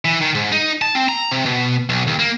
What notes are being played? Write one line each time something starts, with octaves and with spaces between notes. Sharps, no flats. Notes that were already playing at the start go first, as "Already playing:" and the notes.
E3
D#3
G#2
D#4
A5
C4
A#5
C3
B2
B1
D#2
A#3